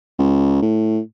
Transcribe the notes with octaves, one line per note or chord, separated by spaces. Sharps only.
C#2
A2